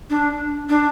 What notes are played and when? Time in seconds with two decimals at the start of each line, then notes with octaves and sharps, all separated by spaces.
0.10 D4
0.69 D4